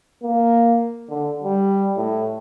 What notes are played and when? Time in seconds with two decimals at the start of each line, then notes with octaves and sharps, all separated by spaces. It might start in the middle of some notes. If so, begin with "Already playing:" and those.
0.23 A#3
1.09 D3
1.43 G3
1.97 A2